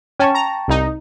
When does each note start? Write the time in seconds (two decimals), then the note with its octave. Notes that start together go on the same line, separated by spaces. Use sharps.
0.19 C#4 G5 A5 C#6
0.35 A#5
0.68 C2 D#4